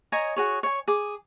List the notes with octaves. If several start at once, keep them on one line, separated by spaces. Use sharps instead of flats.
C#5 D#5 G#5 A#5
F#4 G#4 C#5
C#5 G#5
G#4 D6